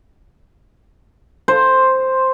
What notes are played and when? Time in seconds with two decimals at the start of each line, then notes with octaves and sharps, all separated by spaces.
1.48 C5